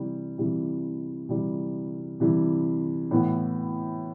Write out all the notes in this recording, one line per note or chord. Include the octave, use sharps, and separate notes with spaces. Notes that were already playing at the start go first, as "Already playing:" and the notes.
Already playing: C3 E3 G3
C3 E3 G3
C3 E3 G3
C3 E3 G3
A2 E3 B3